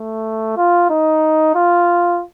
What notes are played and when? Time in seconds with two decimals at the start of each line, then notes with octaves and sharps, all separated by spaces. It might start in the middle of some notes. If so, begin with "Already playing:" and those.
Already playing: A3
0.57 F4
0.89 D#4
1.55 F4